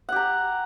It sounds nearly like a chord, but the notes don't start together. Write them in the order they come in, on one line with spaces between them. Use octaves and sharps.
F#5 G4 A#5